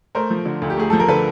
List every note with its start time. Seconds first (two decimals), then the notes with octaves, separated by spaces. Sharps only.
0.15 A3 A#4 C5
0.30 F3
0.45 D3
0.62 D2
0.70 G4
0.77 A3 G#4
0.90 F3 A4
1.00 A#4
1.08 D3 A4 B4